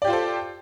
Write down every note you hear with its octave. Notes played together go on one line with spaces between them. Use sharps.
F4 G4 A4 C5 D5